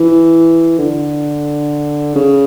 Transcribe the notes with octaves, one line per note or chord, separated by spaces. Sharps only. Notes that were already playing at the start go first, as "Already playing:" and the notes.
Already playing: E3
D3
C#3